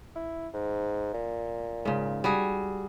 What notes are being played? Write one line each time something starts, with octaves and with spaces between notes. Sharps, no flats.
E4
G#2
A#2
G#2 C#3
G3 F#4 G#4